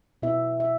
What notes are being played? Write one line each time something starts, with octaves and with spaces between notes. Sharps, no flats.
B2 B3 E4 E5
E5